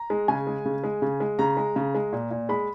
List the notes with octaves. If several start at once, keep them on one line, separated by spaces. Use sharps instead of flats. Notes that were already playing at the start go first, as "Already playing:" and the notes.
Already playing: A#5
G#3
C#3 G#5
G#3
C#3
G#3
C#3
G#3
C#3 A#5
G#3
C#3
G#3
A#2
A#2
G#3 B5